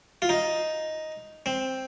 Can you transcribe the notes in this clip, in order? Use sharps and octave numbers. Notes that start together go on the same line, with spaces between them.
F4
D#4
C4